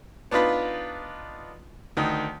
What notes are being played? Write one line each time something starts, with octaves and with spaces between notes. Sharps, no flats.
B3 D4 D#4 F4 B4
D2 D#3